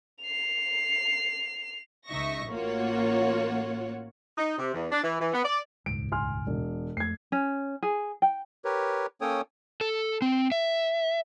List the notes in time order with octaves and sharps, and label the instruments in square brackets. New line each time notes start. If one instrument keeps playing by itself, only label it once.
[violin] C7 F7
[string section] C#2 D#4 E5 C#6 A#6
A1 A#3 F4 F#4 C#5 F#5
[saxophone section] D#4
C3
E2
D4
E3
E3
B3
D5
[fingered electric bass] D#1 C#2 G#2 [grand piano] D7
[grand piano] G#5 C6 F6
E1
[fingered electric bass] F2 A3 [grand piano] G#6 C7
[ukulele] C#4
G#4
G5
[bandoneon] G4 A#4 B4 C#5
A#3 C#4 A4 C#5 G5 D#6
[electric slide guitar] A4
C4
E5